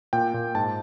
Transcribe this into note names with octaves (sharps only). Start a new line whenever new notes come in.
A#2 G5
A#2
G#2 A5